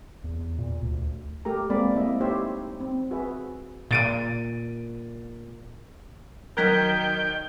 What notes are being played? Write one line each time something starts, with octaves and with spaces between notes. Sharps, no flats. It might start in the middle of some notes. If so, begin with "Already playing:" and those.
E2
A#2
D2
A3 G4 A#4 A#5
G#3 A#3 C4 D5 B5
A3 A#3 C4 E4 D#5 E5
D#4 E4 G4 C5 C#5 E5
C4
F#4 G#4 B4 E5
A#2 A6 D7 D#7
D#3 F#3 A#4 G5 F#6 G#6 B6